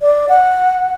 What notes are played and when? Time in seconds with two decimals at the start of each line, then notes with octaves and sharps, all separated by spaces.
0.01 D5
0.29 F#5